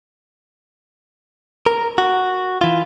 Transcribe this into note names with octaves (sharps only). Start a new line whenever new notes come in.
A#4
F#4
E3 F4